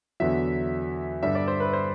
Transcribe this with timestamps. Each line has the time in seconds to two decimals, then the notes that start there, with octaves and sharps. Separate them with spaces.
0.20 E2 D3 F#3 E5
1.22 G2 D3 G3 E5
1.35 D5
1.48 C5
1.60 B4
1.73 C5